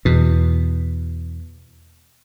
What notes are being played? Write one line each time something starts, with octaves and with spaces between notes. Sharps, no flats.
E2 B2